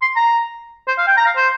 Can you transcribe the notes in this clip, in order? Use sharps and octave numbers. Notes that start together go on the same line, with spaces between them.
C6
A#5
C5
F5
G5
A#5
F5
C5